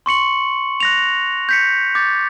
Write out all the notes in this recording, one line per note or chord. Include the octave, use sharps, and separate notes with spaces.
C6 C#6 C#7 F#7
F#6 A#6 F7
G6 B6 C#7
D6 G6 A6